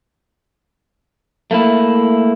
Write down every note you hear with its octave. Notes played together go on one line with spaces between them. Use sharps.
A3 A#3 E4